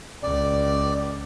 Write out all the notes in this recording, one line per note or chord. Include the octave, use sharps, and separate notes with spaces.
C#2 D5